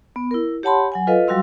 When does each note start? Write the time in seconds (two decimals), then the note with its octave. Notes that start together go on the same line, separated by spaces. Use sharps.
0.16 B3
0.31 E4 A#4
0.63 G4 C#5 F#5 A5 B5 C6
0.92 F#3 F#5 G#5
1.07 F4 A4 B4 D#5 F5
1.28 F#3 G3 F#4 F5 C6 E6